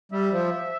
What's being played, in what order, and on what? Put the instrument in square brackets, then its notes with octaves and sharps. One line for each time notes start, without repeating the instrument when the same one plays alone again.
[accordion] G3 [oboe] E5
[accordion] F3